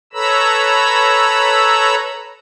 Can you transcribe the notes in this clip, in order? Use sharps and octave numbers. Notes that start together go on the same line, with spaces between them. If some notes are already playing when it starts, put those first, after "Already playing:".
A4 B4 C#5 A#5 B5 E6